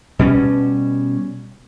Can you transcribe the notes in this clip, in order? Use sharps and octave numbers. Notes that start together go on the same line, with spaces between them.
B2 G3 C#4